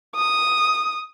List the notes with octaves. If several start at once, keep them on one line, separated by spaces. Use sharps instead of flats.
D#6